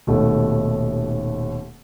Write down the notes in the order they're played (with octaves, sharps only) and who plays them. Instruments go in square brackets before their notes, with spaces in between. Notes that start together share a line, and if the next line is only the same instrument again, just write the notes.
[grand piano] D#1 D#2 B2 A3